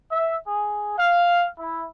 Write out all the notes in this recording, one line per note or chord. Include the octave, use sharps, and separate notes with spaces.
E5
G#4
F5
E4